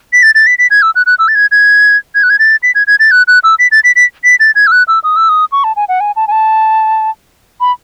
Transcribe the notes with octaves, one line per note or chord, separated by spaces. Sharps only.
B6
A6
A6
B6
B6
G#6
E6
F#6
F#6
E6
A6
G#6
G#6
G#6
F#6
G#6
A6
B6
G#6
G#6
A6
F#6
F#6
E6
B6
A6
B6
B6
B6
A6
G#6
E6
F#6
E6
D#6
E6
D#6
C#6
A5
G#5
F#5
G#5
A5
G#5
A5
B5